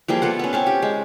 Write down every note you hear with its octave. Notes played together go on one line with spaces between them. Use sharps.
F3 G3 A#3 G#4
B3 F4 A4 F#5
B3 C#4
C4 C#4 A5
G4
G#3